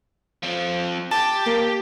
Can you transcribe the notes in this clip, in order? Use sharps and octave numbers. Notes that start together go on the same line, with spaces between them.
F3 C4
G4 A5
A#3